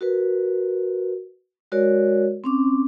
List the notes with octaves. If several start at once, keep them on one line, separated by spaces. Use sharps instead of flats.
F#4 A#4 B4
G#3 F#4 A#4 C#5 D5
C4 C#4 D6